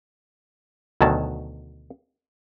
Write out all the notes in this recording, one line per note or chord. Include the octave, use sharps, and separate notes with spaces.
D2 B2 D#3 F#3 A5